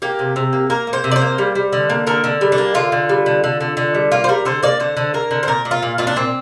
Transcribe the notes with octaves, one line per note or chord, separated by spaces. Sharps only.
A#3 G4
C3
C3
A#3
A#3 A#4
A#3
C5
C3
D5
C5
A#3
G3
G3
D3
A#3
D3 A#4
D3
G3
D4
A#3
D3 F4
D3
G3
D3
D3
D3
D3
G3
A#3 F4
C5
G3 A#4
D3 C5
A#3 D5
D3 C5
D3
A#3 A#4
D3
C5
A#2 A#4
A#2
F4
A#2
A#2 F4
D4
A#2 C4